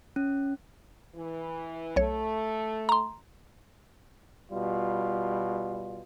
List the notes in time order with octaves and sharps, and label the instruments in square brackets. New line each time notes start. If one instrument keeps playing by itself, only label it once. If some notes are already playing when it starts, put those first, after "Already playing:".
[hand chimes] C#4
[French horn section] E3
[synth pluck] B1 C#5 [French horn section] A3
[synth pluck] A#5 C6
[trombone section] B2 G3 F4